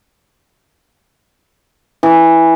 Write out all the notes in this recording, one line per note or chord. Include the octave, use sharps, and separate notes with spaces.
E3